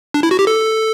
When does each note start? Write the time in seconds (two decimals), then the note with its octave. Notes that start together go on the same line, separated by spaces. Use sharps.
0.14 D4
0.23 E4
0.31 F#4
0.39 G4
0.47 A4